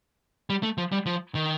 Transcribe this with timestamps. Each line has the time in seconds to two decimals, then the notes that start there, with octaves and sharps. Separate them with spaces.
0.50 G3
0.63 A3
0.78 F3
0.92 G3
1.06 F3
1.35 D#3